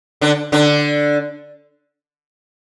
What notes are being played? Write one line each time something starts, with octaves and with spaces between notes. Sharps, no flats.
D3 D4
D3 D4